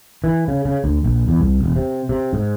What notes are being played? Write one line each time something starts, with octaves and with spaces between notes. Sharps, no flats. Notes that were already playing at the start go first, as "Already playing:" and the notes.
E3
C#3
C#3
D2
A#1
E2
C2
E1
C3
C3
G#2